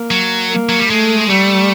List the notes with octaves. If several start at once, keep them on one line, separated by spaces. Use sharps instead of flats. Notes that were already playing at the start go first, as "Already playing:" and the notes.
Already playing: A#3
F#3
A#3
F#3
G3
G#3 A3
G3 A3